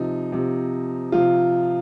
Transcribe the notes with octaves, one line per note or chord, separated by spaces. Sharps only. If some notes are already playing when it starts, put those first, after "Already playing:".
Already playing: C3 F3 D#4
C3 F3
C3 F3 F4